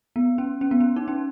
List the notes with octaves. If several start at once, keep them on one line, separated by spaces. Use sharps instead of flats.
B3
C#4
C#4
B3
C#4
D#4
C#4